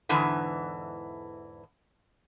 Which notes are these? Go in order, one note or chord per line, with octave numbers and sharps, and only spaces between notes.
E2 G#2 D3 E3